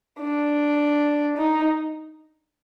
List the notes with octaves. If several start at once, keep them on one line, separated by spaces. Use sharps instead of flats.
D4
D#4